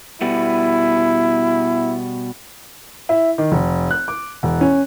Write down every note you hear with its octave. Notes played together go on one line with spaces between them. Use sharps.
B2 G3 B3 E4
E4
D#3
F1
F#6
D6
E1
C#4